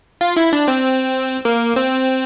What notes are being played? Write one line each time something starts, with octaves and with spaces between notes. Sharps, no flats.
F4
E4
D4
C4
A#3
C4